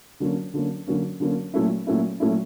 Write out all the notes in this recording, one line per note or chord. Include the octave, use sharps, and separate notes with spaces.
D3 F#3 A#3 C#4
D3 F#3 A#3 C#4
D3 F#3 A#3 C#4
D3 F#3 A#3 C#4
A#2 F#3 A3 C#4 E4
A#2 F#3 A3 C#4 E4
A#2 F#3 A3 C#4 E4